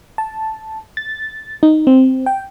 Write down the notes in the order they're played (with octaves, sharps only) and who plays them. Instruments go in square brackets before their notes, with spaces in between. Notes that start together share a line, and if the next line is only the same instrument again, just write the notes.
[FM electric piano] A5
A6
D#4
C4
G5